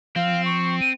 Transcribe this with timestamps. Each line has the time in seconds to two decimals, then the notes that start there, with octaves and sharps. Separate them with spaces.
0.16 F3 C4 F5
0.45 C#6
0.81 D#7